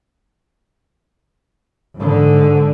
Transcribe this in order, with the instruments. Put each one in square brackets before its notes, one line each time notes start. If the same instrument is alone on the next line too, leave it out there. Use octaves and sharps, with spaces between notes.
[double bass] G#2 D3